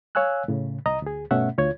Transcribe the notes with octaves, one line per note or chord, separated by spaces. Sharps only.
C#5 F5 G#5 E6 F#6
A2 C#3
C2 D#5 A#5 D#6
D2 G#4
G2 B2 A3 C#4 E5 F#5
D2 F4 C#5 G#6